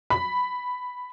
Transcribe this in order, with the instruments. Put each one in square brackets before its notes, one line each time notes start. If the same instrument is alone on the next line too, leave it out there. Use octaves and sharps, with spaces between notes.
[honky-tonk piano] B5